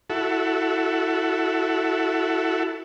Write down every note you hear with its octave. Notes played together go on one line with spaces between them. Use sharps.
E4 F#4 A4